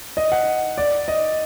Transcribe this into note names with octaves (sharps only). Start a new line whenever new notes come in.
D#5
F#5
D5
D#5